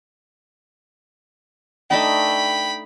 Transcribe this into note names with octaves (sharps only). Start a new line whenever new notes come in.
A3 D4 D#4 G5 B5